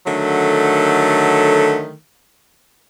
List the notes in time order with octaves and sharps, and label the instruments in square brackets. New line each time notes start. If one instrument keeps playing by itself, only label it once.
[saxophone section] D3 D#3 F#3 A3